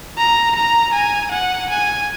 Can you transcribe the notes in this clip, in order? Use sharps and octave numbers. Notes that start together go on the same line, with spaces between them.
A#5
A#5
G#5
F#5
G#5